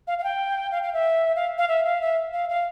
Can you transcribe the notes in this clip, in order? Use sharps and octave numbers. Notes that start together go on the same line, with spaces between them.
F5
F5
G5
F5
F5
E5
F5
F5
E5
F5
E5
F5
F5